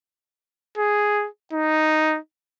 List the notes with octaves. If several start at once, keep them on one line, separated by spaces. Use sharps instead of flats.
G#4
D#4